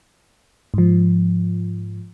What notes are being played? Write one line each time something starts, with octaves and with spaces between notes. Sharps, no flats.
G#2 F3